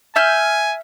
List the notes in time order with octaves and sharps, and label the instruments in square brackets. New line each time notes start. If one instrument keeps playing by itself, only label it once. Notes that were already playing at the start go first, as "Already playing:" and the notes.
[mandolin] E5 F6 G6 [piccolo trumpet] G#5